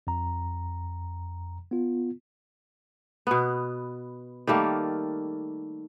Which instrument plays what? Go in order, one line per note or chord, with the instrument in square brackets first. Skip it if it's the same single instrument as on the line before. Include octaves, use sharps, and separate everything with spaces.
[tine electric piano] F2 A#5
B3 F4
[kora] B2 B3
D#3 G3 A3 A#3